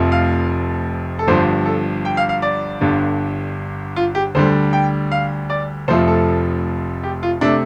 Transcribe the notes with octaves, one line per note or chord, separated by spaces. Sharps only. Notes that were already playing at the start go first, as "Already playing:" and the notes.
Already playing: F1 F2 F3 A3
F5
A4
G1 G2 F3 C5
A4
G5
F5
F5
D5
G1 G2 D3
F4
G4
D2 D3 G3 C5
G5
F5
D5
F1 F2 F3 A3 C5
A4
G4
F4
C3 A3 D4